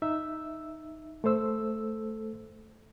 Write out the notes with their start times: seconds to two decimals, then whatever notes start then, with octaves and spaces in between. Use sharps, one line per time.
0.02 D#4 E5 E6
1.24 A3 A4 C5 E6